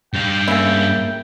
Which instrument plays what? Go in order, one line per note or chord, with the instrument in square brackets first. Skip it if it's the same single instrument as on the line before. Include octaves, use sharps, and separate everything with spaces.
[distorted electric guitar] G2 F5 [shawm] G5
[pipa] C#3 E4 [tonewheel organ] A#3